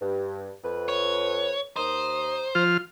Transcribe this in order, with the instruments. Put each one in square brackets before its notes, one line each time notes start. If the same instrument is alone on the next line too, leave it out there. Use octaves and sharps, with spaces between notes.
[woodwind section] G2
F2 B4
[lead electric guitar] C#5
[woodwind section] D#2 A#5 D#6 [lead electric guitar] C5
[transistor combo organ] F3 F4 F6